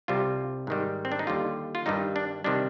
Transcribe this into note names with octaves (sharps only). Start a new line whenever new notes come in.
C2 C3 G3 F4
G#2 D#3 G3
C4
D4
D#4
D#2 D3 G3 F4
F4
G2 D#3 G3 D#4
D4
C3 D#3 G3 D4